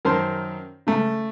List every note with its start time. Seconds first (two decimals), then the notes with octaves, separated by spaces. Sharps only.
0.05 F#2 D#3 A#4 C5 A5 C6
0.87 C#3 A3